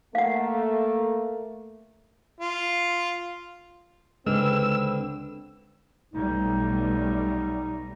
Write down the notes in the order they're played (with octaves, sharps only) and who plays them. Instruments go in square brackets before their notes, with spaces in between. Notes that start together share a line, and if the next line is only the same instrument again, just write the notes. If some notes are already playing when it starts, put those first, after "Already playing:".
[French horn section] A3 A#3 [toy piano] F5 F#5
[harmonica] F4
[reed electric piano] C#2 G#3 F6 [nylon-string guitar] D3 [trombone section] C4 D#4 B4 [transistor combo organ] E6
[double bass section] B1 G3 A3 [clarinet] D#4